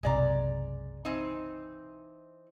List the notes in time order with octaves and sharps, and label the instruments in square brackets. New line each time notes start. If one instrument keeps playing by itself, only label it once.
[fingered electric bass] F#1 B1 C3 [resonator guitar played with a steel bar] G#3 D5 A#5
[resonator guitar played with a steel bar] E3 C4 D#4